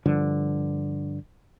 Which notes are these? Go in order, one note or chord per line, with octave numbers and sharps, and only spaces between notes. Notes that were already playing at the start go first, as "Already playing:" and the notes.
G2 D3 F3